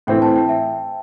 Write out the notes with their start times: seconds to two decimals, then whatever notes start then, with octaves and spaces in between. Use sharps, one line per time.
0.07 A2 E3 C4 G5
0.22 A5
0.36 G5
0.49 E5